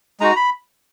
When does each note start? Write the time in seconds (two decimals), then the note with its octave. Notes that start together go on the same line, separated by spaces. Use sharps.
0.20 G#3 D#4 F#4 A#5
0.36 B5